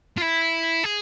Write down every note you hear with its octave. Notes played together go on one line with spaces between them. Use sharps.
F4
E4
G#4